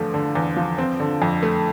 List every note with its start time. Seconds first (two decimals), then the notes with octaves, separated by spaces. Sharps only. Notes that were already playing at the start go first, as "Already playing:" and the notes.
Already playing: E2 D3 F3 A3
0.14 D3
0.35 E2
0.56 F3
0.78 C4
1.00 D3
1.22 F2
1.43 A3